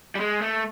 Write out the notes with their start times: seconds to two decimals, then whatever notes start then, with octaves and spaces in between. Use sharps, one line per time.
0.15 G3
0.20 G#3
0.42 A3